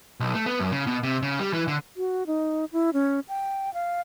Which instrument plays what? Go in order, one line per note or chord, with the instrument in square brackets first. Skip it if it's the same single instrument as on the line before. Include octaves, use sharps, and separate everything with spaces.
[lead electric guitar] B1
A3
B3
F#2
C#3
B2
C3
C#3
G3
E3
D3
[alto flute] F#4
D#4
E4
C#4
G5
F5